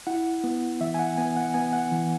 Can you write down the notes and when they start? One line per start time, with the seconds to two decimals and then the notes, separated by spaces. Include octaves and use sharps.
0.07 E4 F#5
0.44 B3
0.81 E3 E5
0.94 G#5
0.99 F#5
1.17 B3 G#5
1.37 F#5
1.54 B3 G#5
1.73 F#5
1.92 E3